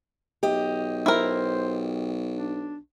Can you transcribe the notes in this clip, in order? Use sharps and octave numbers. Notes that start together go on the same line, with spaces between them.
B1 G4 D#5
E4 A#4 C5
D4